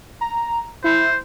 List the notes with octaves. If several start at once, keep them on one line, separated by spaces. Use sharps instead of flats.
A#5
E4 C5